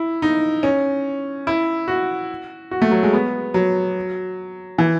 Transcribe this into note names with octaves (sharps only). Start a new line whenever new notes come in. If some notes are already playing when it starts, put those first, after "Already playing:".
Already playing: E4
D#4
C#4
E4
F#4
F#4
A3
F#3
G#3
B3
F#3
E3